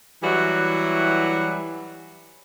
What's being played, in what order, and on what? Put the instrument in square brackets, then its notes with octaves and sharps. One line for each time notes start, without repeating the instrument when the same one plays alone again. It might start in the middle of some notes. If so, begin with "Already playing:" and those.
[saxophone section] E3 F#3 G3 E4 F#4